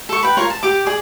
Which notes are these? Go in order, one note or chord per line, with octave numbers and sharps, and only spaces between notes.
A4 C#6
B4 G5
F4 A#4 C#5
A5
G4 D6
G#4 D5